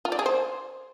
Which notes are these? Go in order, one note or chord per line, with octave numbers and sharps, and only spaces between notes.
F4
D5
G#4
C5